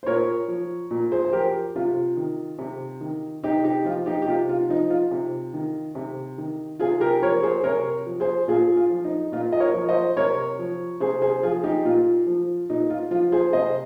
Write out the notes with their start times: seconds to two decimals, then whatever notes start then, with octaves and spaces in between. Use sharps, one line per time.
0.03 C5
0.06 A#2 A#4 C#5
0.48 F3
0.91 A#2
1.12 G#4 C5
1.25 C5
1.32 F3 G4 A#4
1.76 C3 F4
2.17 D#3
2.59 C3
3.01 D#3
3.44 C3 D#4 G4
3.65 D#4 G4
3.85 F3 F4
4.06 D#4 G4
4.22 G4
4.28 C3 F4
4.49 F4
4.69 F3 D#4
4.90 F4
5.11 C3
5.54 D#3
5.95 C3
6.38 D#3
6.79 C3 F4 G#4
7.00 G4 A#4
7.22 F3 A#4 C#5
7.43 G#4 C5
7.64 C3 A#4 C#5
8.06 F3
8.20 G#4 C5
8.48 A#2 F4 G#4
8.77 F4
8.90 F3
9.04 D#4
9.32 A#2 F4
9.52 D#5
9.60 A#4 C#5
9.74 F3
9.89 C5 D#5
10.17 C3 A#4 C#5
10.59 F3
11.00 C3 G#4 C5
11.22 G#4 C5
11.43 F3 F4 G#4
11.64 D#4 G4
11.85 A#2 F4
12.27 F3
12.70 A#2 D#4
12.90 F4
13.11 F3 F4
13.32 G#4 C5
13.53 C3 C5 D#5